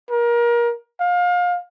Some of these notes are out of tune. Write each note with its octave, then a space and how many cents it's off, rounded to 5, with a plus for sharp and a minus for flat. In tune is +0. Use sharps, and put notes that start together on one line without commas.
A#4 +25
F5 +30